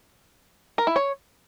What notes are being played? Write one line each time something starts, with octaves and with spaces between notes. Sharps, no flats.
A#4
E4
C#5